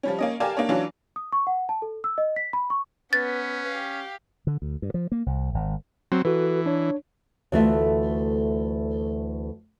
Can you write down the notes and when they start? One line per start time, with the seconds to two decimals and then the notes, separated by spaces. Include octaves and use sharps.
0.03 F3 G3 C#4
0.19 A#3 C#4 D#5
0.40 G4 A#4 D5 F5 G#5 A5
0.57 A#3 D4 C#5
0.69 E3 F#3 C#4 D4 F4
1.16 D#6
1.32 C#6
1.47 F#5
1.69 A5
1.82 A4
2.04 E6
2.18 D#5
2.36 B6
2.53 B5
2.70 C#6
3.13 B3 C#4 B4 A6
3.68 G4 F5
4.47 D3
4.62 D2
4.82 G2
4.94 F3
5.12 A#3
5.26 C2
5.54 G#1
6.12 F#3 C4
6.25 E3 F#4 A4 B4
6.66 D4 C#5
7.52 D2 E3 A3 F4 E5